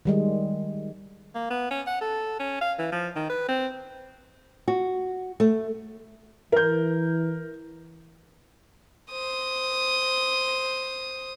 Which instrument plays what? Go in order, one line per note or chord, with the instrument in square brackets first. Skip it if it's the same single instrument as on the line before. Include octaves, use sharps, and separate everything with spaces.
[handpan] D#3 G3 G#3
[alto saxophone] A#3
B3
C#4
F#5
A4
C#4
F5
E3
F3
D#3
B4
C4
[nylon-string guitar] F#4
A3
[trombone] E3 [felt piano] A#4 G6
[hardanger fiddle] C5 D#6